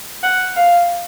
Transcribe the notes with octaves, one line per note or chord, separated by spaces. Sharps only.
F#5
F5